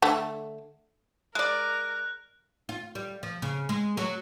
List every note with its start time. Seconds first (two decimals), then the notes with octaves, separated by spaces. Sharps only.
0.02 D3 A3
1.35 G#3 A#4 D5 F#6
2.69 F4
2.95 G3
3.23 F3
3.42 C#3
3.69 G#3
3.97 F#3